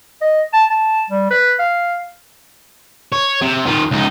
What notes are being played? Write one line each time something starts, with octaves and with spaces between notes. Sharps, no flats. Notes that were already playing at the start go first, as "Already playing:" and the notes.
D#5
A5
A5
G3
B4
F5
C#5
C3
D#3 F4
C#2 D#4